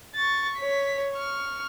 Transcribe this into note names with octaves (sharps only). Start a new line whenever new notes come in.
C#6 A6
C#5 B6
C#6 F6